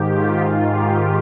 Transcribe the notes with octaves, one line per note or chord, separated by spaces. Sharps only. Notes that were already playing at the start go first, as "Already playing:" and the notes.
Already playing: G#2 D#3 G4
F4
G#2 D#3
G4